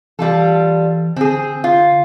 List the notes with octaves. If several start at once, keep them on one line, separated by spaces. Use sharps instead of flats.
E3 G3 F4 A4
D3 C4 G#4
F4